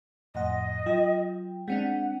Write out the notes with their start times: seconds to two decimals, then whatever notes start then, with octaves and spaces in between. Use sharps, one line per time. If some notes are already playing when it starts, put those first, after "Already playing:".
0.35 F2 A2 D#5 F#5
0.86 F#3 F4 G5
1.68 G#3 C4 D4 F#5